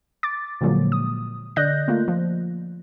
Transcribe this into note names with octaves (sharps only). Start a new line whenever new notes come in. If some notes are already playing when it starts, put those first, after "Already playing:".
D6 A6
A#2 D3 F3 F#3 G#3 A#3
D#6
D3 D5 D#5 F#6 G6 A#6
A3 A#3 F4
F3